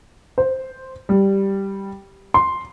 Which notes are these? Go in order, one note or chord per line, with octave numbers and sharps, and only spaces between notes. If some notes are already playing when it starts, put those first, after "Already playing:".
C5
G3
C6